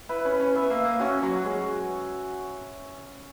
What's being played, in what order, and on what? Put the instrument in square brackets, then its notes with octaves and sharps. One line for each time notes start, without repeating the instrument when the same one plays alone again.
[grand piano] E4 [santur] B4
[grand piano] C#4
[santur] B4
[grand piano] C#4
[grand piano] B3 [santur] E5
[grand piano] A#3
[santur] E5
[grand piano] A#3
[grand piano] C#4 [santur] F#4
[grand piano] F#3 [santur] F#4
[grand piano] G#3 [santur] C#4